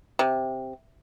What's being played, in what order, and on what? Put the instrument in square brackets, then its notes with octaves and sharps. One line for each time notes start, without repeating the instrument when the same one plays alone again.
[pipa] C3